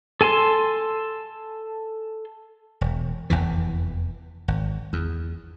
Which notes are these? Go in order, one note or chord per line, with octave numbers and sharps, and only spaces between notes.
A4 G#5 A5 C6
E1
F1 A#1 E2 E3
G#1
E2